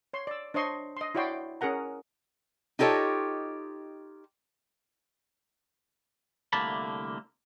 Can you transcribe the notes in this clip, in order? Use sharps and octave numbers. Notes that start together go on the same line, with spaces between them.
C#5 C6
D5 E6
D4 C5 C#5 D#5 C6 C#6
D#5 C6
E4 F#4 C#5 D5 G5 C6
C#4 G#4 A#4 F#5 A#5
D#4 F4 G4 A4 C#5 D#5
C2 D3 A3 A#3 A5 B5